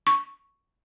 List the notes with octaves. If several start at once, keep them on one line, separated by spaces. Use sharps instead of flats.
C#6